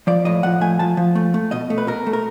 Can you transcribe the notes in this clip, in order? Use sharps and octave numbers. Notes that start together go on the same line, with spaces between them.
F3 D5
A2 D#5
F3 F#5
A3 G#5
F3 A5
F3
A3
A3
B2 D#5
A3
B4
B2 A#4
A3
A#4